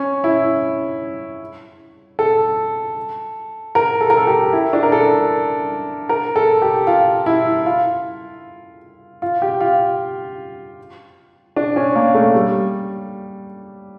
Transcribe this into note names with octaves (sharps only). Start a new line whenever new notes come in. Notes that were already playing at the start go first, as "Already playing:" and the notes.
Already playing: C#4
E4
A4
A#4
A4
A#4
A4
G4
E4
D4
A#4
A4
A#4
A4
G4
F4
E4
F4
F4
G4
F4
D4
C#4
A#3
A3
G3